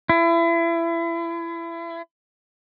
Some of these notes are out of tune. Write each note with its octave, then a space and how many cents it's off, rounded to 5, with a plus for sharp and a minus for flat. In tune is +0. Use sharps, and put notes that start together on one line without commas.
E4 +30